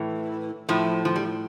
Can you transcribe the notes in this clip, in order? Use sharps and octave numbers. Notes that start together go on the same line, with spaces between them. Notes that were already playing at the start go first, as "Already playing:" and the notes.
Already playing: A2 E3
A2 F3
F3
G3